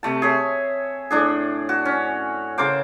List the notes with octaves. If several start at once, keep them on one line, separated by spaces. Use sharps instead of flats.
C3 A3 A5
G#4 C#5 E5
A2 D4 G#4
F#4
C#4
C#3 A#4 C5 D6